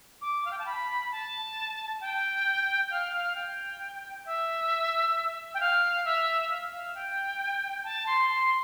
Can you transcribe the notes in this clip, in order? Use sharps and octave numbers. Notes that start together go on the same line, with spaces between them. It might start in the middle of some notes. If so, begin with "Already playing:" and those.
D6
F5
G5
A5
B5
A5
G5
F5
F5
G5
E5
G5
F5
E5
F5
F5
G5
A5
C6
C6